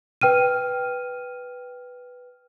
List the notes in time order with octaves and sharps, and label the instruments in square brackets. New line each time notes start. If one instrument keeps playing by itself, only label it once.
[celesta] B4 G5 F6 D#7